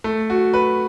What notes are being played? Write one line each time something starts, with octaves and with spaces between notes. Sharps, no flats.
A3
F#4
B4